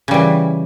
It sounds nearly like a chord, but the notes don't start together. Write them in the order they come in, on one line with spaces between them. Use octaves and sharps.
C#3 G3 E3